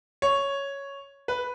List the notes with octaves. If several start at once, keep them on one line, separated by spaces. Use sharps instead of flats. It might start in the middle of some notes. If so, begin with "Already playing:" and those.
C#5
B4